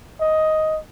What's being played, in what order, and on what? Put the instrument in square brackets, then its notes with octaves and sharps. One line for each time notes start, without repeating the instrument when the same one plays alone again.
[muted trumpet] D#5